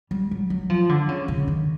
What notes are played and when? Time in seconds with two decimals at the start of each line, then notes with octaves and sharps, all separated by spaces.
0.11 G3
0.31 F#3
0.50 F#3
0.70 F3
0.89 D3
1.08 C#3
1.28 C#3
1.48 D#3